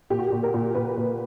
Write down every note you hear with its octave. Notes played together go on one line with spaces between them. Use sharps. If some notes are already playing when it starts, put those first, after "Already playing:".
A#2 G4
F#4
G4
A#2
A#4
A#2
A#2 B4
A#2